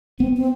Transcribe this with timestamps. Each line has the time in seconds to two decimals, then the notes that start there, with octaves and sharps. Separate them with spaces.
0.19 B3 C4
0.37 C4